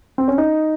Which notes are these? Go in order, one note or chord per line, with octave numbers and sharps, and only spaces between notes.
C4
C#4
D#4